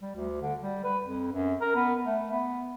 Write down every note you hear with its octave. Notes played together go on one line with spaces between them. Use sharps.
G3
D2
D3
G3
B4
F2
F#2
A#4
B3
A3
B3